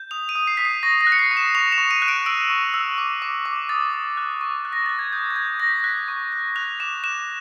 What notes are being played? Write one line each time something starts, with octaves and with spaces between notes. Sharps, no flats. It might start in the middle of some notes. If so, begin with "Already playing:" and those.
Already playing: G6
D#6 F7
D#7
D#6
C7
D#6 B6
C7
C#6 A#6
A#6
F#6
C#7
C7
C#6
E7
C#6 F7
E7
C#6
D#7
F#6
D7
E6 D7
C#6
E6
D6
D6
D6
D#6 A6
D#6
F#6
C#6
F#6
A#6
F#6 A6
G#6
D#6 G6
G#6
G6
G6 A#6
B6
A#6
F#6 B6
C#6
F#6
F#6 F7
D6 E7
F#6 E7